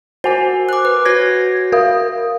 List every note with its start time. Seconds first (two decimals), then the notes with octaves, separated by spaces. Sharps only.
0.24 F#4 A#4 C5 G#5
0.69 D6 F#6
0.85 B4
1.05 F#4 C#5 G#6 A#6
1.72 A#4 F5 D#6